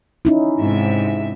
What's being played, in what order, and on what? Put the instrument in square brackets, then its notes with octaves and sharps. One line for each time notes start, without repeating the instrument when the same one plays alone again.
[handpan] C#4 D#4 E4
[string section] G#2 C3 E5